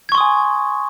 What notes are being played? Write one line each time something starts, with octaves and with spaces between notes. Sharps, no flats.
G#5 C6 C#6 D#6 G#6